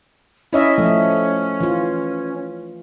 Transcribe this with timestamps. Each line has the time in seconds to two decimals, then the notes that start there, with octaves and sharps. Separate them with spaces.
0.53 C#4 E4 D#5 E5
0.78 F3 A3
1.60 E3 F4